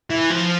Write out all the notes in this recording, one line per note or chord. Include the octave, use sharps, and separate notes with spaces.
E3
F3